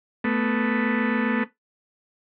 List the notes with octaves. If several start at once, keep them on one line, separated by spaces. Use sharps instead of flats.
A3 B3